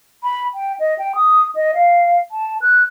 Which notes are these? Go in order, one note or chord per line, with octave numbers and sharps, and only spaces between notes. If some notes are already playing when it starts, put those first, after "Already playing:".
B5
G5
D#5
G5
D#6
D#5
F5
A5
F#6